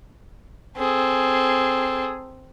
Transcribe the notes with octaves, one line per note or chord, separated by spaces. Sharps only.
C4 G#4 A4